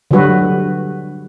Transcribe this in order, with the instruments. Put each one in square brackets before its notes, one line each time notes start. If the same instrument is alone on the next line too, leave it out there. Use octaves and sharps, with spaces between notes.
[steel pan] D3 F#3 G3 F#4 B4